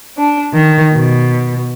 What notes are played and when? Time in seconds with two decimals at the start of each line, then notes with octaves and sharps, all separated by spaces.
0.18 D4
0.54 D#3
0.94 B2